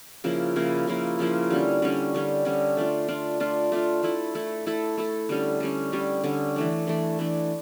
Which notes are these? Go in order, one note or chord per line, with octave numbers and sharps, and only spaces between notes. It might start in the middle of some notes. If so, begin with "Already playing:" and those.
C#3 F3 A#3 E4
C#3 F3 A#3 E4
C#3 F3 A#3 E4
C#3 F3 A#3 E4
D3 G3 C#4
D3 G3 C#4
D3 G3 C#4
D3 G3 C#4
A3 D4 F4
A3 D4 F4
A3 D4 F4
A3 D4 F4
A3 E4 A4
A3 E4 A4
A3 E4 A4
A3 E4 A4
D3 G3 C#4
D3 G3 C#4
D3 G3 C#4
D3 G3 C#4
E3 A3 D4
E3 A3 D4
E3 A3 D4